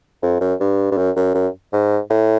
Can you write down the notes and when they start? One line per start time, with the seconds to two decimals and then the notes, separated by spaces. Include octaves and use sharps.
0.23 F2
0.41 F#2
0.60 G2
0.92 G2
0.97 F#2
1.16 F#2
1.35 F#2
1.73 G#2
2.10 A2